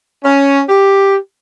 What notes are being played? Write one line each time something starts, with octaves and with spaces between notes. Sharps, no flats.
C#4
G4